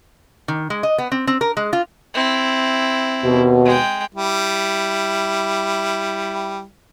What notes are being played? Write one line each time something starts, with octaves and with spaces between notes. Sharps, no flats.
D#3
G#3
D#5
B3
C4
C4
A#4
G#3
F4
C4 E4
D#2 B2
G#3 G5
G3 E4